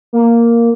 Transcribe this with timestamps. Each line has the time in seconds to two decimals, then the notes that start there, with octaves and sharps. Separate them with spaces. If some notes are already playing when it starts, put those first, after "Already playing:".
0.13 A#3